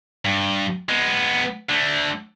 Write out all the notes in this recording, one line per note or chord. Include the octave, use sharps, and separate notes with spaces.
G2
G#3 B3
D3 A3